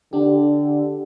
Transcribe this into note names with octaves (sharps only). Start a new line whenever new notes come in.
D3 D4 G4